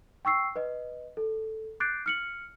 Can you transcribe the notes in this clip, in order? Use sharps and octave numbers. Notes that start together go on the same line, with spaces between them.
G5 C#6 E6 C7
B4 D#5
A4
D6 F#6 G6 A6 C7 D7
F6 C#7 F#7